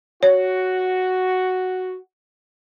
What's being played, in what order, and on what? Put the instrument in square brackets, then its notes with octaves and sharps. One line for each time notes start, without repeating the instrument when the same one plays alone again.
[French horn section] F#4 [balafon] C#5